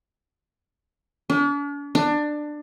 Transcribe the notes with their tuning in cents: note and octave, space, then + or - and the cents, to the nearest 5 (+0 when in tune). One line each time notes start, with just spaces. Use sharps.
D4 -45
D4 +20